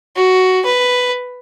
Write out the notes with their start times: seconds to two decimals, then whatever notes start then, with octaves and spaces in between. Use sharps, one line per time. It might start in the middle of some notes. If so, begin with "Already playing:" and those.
0.17 F#4
0.66 B4